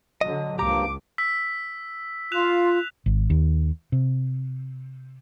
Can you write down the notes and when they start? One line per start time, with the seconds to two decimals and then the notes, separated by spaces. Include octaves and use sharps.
0.21 D3 F#3 D#5
0.59 C#2 G2 F3 A#3 G4 A#5 D6
1.18 E6 B6
2.32 F4 F#6 E7 F7
3.06 G#1
3.30 D#2
3.92 C3